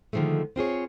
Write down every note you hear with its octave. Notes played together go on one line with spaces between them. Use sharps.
D3 D#3 F3 G#3 A3
C4 F4 G#4 C#5